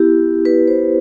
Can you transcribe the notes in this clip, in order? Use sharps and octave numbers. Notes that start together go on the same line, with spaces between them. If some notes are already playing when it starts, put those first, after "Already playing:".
Already playing: B3 E4 G4
B4
C5